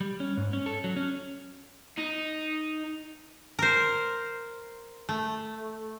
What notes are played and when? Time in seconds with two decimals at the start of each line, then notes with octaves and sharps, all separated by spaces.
0.01 G3
0.20 C#4
0.37 G#2
0.53 C#4
0.66 A4
0.84 F#3
0.97 C#4
1.98 D#4
3.59 A#4 C5
5.09 A3